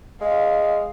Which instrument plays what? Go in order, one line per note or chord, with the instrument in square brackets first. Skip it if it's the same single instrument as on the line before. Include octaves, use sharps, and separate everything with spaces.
[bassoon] G#3 [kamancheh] F5